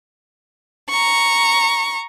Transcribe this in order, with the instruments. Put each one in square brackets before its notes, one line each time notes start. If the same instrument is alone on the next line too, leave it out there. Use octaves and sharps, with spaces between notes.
[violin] A#5 C#6